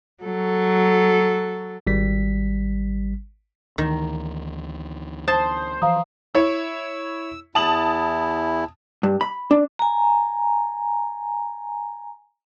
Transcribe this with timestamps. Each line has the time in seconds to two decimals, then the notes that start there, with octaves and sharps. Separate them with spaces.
0.24 F#3 A4
1.87 G#1 G3 B6
3.78 D2 D#3 E3
5.28 C5 A5 D#6
5.82 E3 F3 F5 A#5 D#6
6.35 E4 C#5 E6
7.55 E2 E4 A5 D#6 F#7
9.03 G2
9.21 B5
9.51 D4
9.79 G#5 A#5